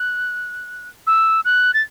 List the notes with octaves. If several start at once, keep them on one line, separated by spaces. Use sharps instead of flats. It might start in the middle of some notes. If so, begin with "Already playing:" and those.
Already playing: F#6
E6
F#6
A6